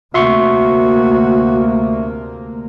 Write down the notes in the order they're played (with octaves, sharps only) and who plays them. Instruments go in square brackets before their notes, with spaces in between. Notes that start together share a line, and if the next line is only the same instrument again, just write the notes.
[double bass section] D2 C3 A#3 [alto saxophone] F#4 [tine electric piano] E5 C6 C#6